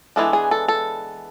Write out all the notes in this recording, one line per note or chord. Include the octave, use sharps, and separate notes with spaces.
E3 G#3 B3 D4 A4
G#4
A4
A4